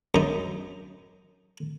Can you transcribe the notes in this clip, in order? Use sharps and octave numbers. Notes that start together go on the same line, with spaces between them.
F#2 D#4